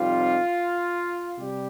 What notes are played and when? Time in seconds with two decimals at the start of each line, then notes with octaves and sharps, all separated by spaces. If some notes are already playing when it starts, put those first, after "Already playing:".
Already playing: F2 C3 G3 C4 D#4 F4
1.38 C3 G3 G4